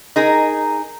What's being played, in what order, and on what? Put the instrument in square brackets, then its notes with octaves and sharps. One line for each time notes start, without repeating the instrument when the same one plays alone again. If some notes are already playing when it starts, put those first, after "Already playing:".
[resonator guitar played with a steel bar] D#4 G#4 A#4